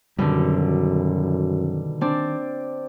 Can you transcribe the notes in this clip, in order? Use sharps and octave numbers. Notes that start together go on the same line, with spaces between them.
F#2 B2 D3 D#3 G3
C4 D4 D5